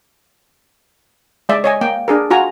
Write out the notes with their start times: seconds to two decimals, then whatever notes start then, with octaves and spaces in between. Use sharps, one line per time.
1.49 G#3 D5 E5
1.64 C#5 D#5 G#5
1.81 A#3 G5
2.08 D4 G#4 A#4
2.30 F4 F#4 G#5 A#5